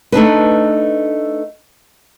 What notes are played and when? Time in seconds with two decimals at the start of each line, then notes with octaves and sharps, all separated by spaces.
0.12 A3 D4 D#4 B4